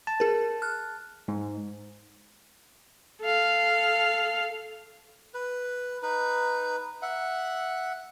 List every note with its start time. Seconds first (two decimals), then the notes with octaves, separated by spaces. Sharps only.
0.07 A5
0.20 G#4 A#4
0.62 F6 F#6
1.28 G#2
3.21 A4 F5
5.34 B4
6.03 D#4 B4
7.02 E5 F#5